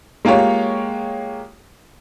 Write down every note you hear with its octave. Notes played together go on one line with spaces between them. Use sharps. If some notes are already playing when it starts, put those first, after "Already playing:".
G#3 A#3 F4 G4 C#5